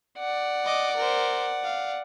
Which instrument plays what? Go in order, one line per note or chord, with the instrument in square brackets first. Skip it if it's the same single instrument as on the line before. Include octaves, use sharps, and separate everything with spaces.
[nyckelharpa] D5 F#5
[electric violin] D#5 D6
A#4 C5
F5